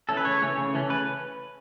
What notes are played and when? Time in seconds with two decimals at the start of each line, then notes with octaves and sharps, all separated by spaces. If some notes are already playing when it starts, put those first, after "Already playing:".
0.09 E3 A3 C#4 A4
0.17 B4
0.25 C#3 C#5
0.41 E3 A3 C#4
0.57 C#3
0.74 E3 A3 C#4
0.89 C#3 B4